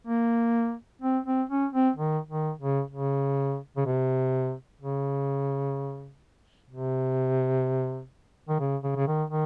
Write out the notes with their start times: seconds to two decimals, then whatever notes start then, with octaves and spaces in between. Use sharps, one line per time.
0.07 A#3
1.02 C4
1.26 C4
1.49 C#4
1.73 C4
1.96 D#3
2.29 D#3
2.60 C#3
2.91 C#3
3.77 C#3
3.86 C3
4.81 C#3
6.70 C3
8.49 D#3
8.60 C#3
8.83 C#3
8.96 C#3
9.07 D#3
9.30 D#3